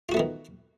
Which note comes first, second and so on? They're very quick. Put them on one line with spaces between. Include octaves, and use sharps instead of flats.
F4 F#4 A3 B3 D#3